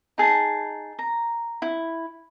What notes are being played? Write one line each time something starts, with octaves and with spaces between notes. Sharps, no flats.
D#4 G#4 A5
A#5
E4